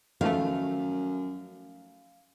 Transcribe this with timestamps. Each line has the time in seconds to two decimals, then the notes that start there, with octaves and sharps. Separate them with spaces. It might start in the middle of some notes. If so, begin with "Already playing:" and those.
0.21 F#2 D#3 F3 A3 F5